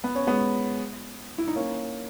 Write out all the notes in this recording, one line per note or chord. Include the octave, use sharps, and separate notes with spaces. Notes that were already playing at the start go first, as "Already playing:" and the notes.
B3
C#4
G#3 B3
E4
D#4
A#3 C#4